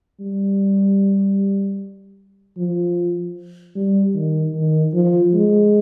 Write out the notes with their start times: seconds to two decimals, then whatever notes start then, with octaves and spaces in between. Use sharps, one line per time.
0.20 G3
2.57 F3
3.76 G3
4.15 D#3
4.55 D#3
4.94 F3
5.34 G#3